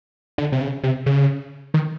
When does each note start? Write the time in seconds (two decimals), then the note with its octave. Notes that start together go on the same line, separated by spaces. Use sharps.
0.38 D3
0.52 C3
0.61 C#3
0.83 C3
1.06 C#3
1.74 D#3